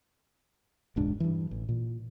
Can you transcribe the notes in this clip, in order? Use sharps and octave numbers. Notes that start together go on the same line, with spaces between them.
E1 C#2 G#2 D4
G2 E3
A1
A#2